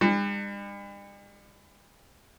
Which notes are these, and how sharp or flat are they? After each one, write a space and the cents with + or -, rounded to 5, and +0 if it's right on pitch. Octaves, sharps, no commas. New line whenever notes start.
G3 +45 D4 +45